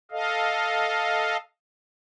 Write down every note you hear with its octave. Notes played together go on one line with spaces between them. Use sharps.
A4 D#5 F5